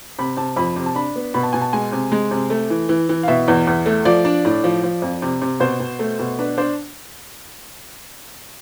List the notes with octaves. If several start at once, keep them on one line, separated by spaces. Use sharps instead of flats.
C3 B5
C3 A5
F2 B5
C3
A5
D4 B5
B3
B2 B5
A5
B2 G#5
A5
G#3 G#5
C3
G#3
C3
A3
E3
E3
E3
F5
B2 E5
E2
E2
A3
F3 D5
D4
A2
F3
F3
F2
C3
C3
B2 C5
B2
A3
B2
D4 B4
D4 C5